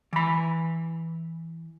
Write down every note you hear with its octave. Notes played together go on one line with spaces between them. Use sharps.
E3 B5